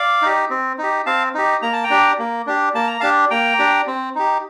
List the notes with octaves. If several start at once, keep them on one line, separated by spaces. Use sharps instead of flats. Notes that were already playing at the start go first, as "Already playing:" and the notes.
Already playing: D5 F5
D#4 G4
C4
D#4 G4
C4 F5 A5
D#4 G4
A#3 A#5
A5
G5 A#5
D4 G4
A#3
D4 G4
A#3 A5
A#5
D4 G4 F5 A5
A#3 G5 A#5
D4 G4
C4
D#4 G4